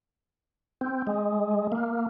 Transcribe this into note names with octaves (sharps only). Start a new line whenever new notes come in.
C4
G#3
A#3